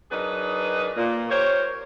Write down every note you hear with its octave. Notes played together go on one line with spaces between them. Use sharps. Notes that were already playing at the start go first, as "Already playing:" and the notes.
F#3 D4 D#4 G#4 A#4 B4
A#2
G4 A#4 C5 C#5